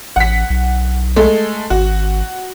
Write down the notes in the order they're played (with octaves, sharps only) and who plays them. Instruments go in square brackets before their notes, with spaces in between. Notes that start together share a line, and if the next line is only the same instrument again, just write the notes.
[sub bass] A1 [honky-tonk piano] F#5 B6
[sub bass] B1
[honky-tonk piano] G#3 A3 A4
[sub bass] G#1 [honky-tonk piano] F#4